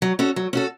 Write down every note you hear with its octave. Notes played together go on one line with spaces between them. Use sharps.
F#3
C#4 F#4 A4
F#3
C#4 F#4 A4